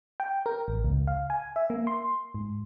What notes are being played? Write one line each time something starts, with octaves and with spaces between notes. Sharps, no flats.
G5
A#4
A1
C#2
F5
G#5
E5
A#3
C6
G#2